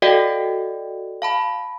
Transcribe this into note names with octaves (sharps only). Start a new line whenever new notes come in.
F#4 A4 D5 D#5 F5 G5
F5 A5 B5